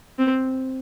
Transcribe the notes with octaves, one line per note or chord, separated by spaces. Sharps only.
C4